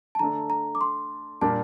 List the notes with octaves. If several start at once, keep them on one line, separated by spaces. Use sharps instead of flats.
A5
D3 A3 D4 A4 A#5
A#5
D6
C6
A#2 G3 D4 G4 A#4 A5